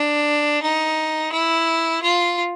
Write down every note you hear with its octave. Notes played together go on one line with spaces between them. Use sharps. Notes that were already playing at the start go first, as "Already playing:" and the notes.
Already playing: D4
D#4
E4
F4